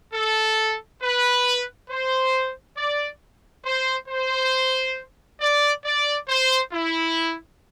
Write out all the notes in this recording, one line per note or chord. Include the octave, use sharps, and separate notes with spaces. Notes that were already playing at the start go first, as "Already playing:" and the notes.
A4
B4
C5
D5
C5
C5
D5
D5
C5
E4